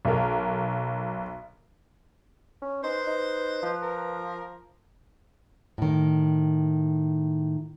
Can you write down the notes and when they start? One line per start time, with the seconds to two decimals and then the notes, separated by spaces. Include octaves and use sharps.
0.05 B1 A#4
2.62 C#4
2.84 D#4 B4 C5
3.07 D#4
3.63 F3
3.82 A#4
5.78 A2 D#3